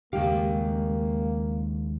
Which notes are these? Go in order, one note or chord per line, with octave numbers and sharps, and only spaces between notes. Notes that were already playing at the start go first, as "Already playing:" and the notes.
D#2 C#3 G#3 A#3 G4 F5